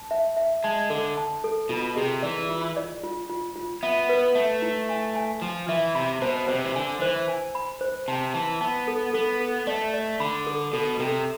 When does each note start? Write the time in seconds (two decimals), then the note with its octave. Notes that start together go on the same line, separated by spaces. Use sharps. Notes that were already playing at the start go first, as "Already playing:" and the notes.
Already playing: A5
0.11 E5
0.37 E5
0.64 G#3 A5
0.90 D3 A4
1.17 A5
1.44 A4
1.69 B2 F4
1.96 C3 G#4
2.23 E3 D5
2.49 F4
2.77 D5
3.03 F4
3.29 F4
3.56 F4
3.83 B3 E5
4.09 B4
4.35 A3 E5
4.62 E4
4.89 G#5
5.15 G#5
5.42 F3 G#5
5.69 E3 E5
5.95 C3 B5
6.21 B2 C5
6.48 C3 C5
6.64 E3
6.75 D3 G#5
7.01 E3 C5
7.28 G#5
7.55 B5
7.81 C5
8.08 C3 A5
8.34 E3 A5
8.61 B3 A5
8.88 A4
9.14 B3 A4
9.41 A4
9.67 A3 D5
9.94 D5
10.20 D3 B5
10.47 A4
10.73 B2 A4
10.99 C3 A4